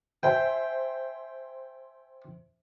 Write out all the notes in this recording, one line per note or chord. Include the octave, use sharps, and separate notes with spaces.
C5 E5 G5 G#5